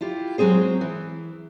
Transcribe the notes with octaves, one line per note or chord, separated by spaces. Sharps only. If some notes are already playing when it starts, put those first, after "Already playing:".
E4 F4 G4
F#3 G#3 C4 G#4 C5
E3